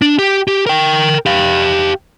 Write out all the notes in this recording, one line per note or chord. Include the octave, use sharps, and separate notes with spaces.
D4
G4
G4
A#4 G5
G4 F5